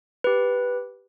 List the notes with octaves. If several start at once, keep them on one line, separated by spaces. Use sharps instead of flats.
G4 B4